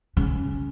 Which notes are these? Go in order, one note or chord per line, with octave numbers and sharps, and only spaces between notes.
C#3